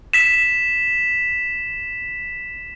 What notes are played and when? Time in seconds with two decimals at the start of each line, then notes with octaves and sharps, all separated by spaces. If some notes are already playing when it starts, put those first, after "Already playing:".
0.13 B6 E7